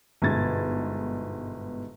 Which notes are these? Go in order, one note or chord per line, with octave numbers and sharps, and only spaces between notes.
G1 G#2 B2 G#6 A6